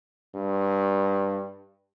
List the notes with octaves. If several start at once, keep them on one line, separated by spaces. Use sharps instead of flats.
G2